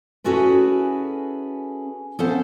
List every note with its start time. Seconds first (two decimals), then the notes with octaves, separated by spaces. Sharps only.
0.24 C#4 E4 F#4 G#4 A4 B4
2.19 B3 C#4 A4 C5 F5 A5